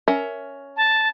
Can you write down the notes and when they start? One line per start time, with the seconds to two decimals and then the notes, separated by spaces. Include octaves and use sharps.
0.08 C#4 A#4 E5
0.77 A5